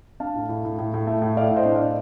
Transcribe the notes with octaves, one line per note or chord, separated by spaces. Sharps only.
D4 F5 A5
A2
A2
A2
A2
A2
A3
A2
A3 D5 F5
A2
C5 D#5
D4
A2 D5 F5